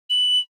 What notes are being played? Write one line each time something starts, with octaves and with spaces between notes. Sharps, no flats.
F#7